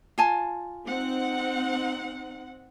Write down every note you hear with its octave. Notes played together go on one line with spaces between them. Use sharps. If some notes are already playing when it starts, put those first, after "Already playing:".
F4 G#5 A5
C4 D#4 F#5